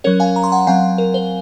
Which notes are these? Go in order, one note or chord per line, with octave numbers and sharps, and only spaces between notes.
F#3 C#4 A#4 C#5
F5 G#5
A#5
C6
F#5 A#5
F#3 C4 F5 G#5
A#4
C5